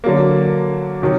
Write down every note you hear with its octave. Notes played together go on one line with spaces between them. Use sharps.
D3 F#3 A#3
C3 D#3 F#3